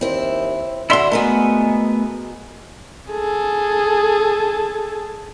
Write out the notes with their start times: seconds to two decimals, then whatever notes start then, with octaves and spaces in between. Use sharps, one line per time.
0.01 D#2 C4 E4
0.90 D3 D4 E4 F#4 E5 C6
1.12 G#3 A3 B3 F#4 G#4 A#4
3.11 G#4 A4